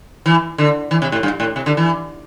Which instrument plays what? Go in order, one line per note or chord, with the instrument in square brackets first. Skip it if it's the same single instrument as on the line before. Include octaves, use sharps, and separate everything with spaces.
[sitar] E3
D3
E3
C3
A2
G2
A2
C3
D3
E3